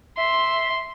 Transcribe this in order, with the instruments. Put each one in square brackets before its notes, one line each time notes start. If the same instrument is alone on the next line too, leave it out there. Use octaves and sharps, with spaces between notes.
[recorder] E5 [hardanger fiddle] C6